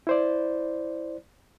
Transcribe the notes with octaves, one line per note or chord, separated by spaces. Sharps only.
E4 C5 D5